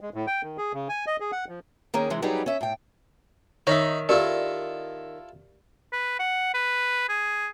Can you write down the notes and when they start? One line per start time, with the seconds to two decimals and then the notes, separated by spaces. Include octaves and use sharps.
0.01 G#3
0.14 A2
0.27 G5
0.43 D#3
0.58 G#4
0.73 C#3
0.89 G#5
1.07 D#5
1.20 G#4
1.32 F#5
1.49 F3
1.94 D#3 A#3 C#4 G#4
2.10 C3 E3 G#3
2.22 F#3 G3 D#4 G4 G#4 B4
2.46 C#4 E5
2.61 A2 G5
3.67 D#3 D#4 C#5 E5 B5
4.09 E4 F4 G4 A4 A#4 D5
5.93 B4
6.19 F#5
6.54 B4
7.09 G#4